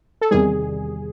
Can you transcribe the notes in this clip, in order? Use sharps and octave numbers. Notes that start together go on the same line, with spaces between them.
A4
E2 C3 D#3 G3 G#4